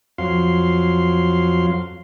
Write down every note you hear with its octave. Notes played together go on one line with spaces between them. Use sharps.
F2 F#3 F5 C6